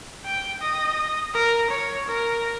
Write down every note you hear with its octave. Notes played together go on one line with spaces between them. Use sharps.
G5
D#5
A#4
C#5
A#4